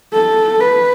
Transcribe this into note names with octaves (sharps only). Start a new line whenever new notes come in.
A4
B4